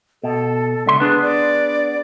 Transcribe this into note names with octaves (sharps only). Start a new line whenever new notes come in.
B2 A4
C#2 D3 E5 C6
B3 D4 G#4 B4
D5